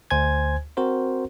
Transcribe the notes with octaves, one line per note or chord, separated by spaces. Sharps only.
D2 C5 G#5 G#6
C4 F#4 A#4 C5